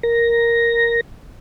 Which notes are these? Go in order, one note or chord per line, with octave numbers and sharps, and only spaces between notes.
A#4 A#6